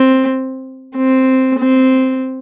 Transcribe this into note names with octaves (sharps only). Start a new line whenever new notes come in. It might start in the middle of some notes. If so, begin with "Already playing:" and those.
Already playing: C4
C4
C4